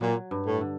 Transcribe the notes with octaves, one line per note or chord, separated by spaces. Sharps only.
A#2 F#3
G2
A2
D3